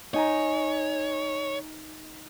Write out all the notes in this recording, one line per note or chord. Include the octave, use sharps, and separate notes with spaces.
D#4 C#5 G#5 A#5